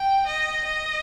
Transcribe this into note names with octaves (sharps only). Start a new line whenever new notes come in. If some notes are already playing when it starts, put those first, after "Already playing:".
Already playing: G5
D#5
D#5